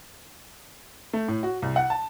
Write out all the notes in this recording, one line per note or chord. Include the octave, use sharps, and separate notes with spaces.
A3
A2
F#4
C2
F#5
A5